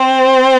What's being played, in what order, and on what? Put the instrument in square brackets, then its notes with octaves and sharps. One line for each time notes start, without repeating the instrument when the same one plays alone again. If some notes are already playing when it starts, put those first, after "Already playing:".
Already playing: [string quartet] C4 C5